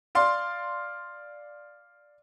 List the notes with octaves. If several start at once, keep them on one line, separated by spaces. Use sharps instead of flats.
D5 F5 C6